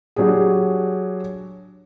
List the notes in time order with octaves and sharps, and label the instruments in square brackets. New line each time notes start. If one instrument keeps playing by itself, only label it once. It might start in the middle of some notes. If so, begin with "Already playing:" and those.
[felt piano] F#3 D4 G4 G#4